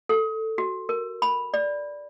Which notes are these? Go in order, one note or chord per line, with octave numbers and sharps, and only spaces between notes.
A4
F#4
A#4
B5
D5